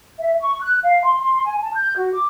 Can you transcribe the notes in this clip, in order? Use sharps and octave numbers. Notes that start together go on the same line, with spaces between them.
E5
C#6
F#6
F5
C6
C6
G#5
A5
G6
F#4
D6